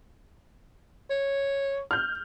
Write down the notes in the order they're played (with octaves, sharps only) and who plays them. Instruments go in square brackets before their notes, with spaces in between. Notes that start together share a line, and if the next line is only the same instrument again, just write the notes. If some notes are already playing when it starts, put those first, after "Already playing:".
[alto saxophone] C#5
[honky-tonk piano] F6 G6